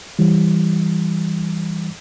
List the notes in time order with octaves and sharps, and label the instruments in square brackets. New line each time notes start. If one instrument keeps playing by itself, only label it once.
[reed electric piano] E3 G3